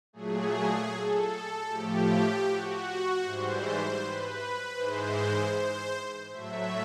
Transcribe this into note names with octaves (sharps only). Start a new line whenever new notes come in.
A#2 F#3 A3 G#4
A4
A2 F3 A3 G4
F#4
G#2 E3 G3 C5
B4
G#2 E3 G#3 C5
C5
A2 F#3 A3 E5